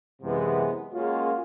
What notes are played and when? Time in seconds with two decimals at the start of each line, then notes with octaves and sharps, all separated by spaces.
0.22 F#2 C3 E3 G#3 B3
0.92 G#3 A#3 C#4 F4 F#4 G#4